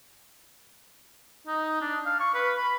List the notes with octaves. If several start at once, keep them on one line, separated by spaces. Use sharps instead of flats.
D#4
D4
F5
C#6
B4
B5